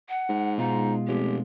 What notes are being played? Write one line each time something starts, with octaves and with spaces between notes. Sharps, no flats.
F#5
G#2
B2 G#3 D#4 F4
F1 G4